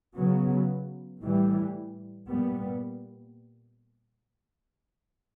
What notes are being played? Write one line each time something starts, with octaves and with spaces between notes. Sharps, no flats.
C#3 F#3 B3
A2 E3 G3
A#2 G3 B3